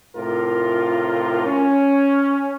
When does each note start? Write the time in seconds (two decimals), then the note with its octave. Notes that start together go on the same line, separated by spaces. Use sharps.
0.16 A2 C3 F4 A#4
1.45 C#4